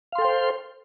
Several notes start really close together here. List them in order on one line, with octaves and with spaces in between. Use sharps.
F5 C6 A4 G5 C5